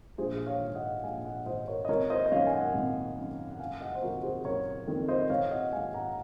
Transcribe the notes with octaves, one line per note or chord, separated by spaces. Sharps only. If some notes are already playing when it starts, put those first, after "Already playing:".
A#1 G#4 C5
C#5 F5
G#2 D#3
D#5 F#5
A#1 F5 G#5
D#5 F#5
G#2 D#3 C5 D#5
A#4 C#5
D#5
G#1 A#4 C#5
C5 D#5
D#5
F#2 D#3 C#5 F5
G#5
D#5 F#5
G#1
F#2 D#3
F#5
F#1 F5 G#5
D#5 F#5
C5
F2 D#3 F#4 A#4
G#4 C5
F#1 A#4 C#5
F2 D#3
C5 D#5
G#1 C#5 F5
D#5 F#5
G#2 D#3 F5 G#5
F#5 A#5